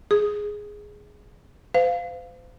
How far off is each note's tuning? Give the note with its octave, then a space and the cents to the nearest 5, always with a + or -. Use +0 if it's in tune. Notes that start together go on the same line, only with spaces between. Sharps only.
G#4 +0 D#6 +0
C5 -40 F5 +0